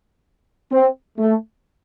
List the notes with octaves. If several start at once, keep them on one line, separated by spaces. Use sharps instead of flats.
C4
A3